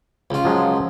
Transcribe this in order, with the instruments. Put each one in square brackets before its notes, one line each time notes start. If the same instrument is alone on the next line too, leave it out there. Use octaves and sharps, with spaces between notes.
[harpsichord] C#2 F4
[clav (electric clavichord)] F3 F#3 G#3